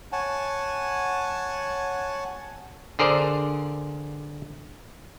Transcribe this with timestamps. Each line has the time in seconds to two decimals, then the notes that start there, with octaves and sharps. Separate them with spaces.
0.12 C#5 F#5 G#5 A5
2.99 D3 G#4 A#4 C5 D5